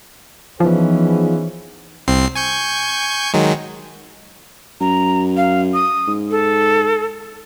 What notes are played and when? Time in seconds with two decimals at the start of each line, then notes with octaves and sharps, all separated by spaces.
0.60 E3 F3 B3 C#4 D#4 G#4
2.08 C2 C4 C7
2.35 G#5 C#6 G6
3.34 D#3 F#3 G#3
4.81 F#2 A#5
5.37 F5
5.74 D#6
6.07 G#2
6.31 A4